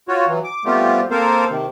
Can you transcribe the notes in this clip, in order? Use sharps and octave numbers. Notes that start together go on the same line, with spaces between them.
F4 F#4 C#5
E3 F#3
D6
G3 A3 B3 C4 F4 G4
A#3 C4 A4 A#4 C5 F5
C3 D#3